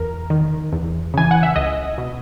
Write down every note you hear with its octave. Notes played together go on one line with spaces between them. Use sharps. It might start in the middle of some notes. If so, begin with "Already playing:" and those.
Already playing: E2 A#4
D#3
E2
C#3 E3 G#5
F#5
E5
C#2 D#5
B2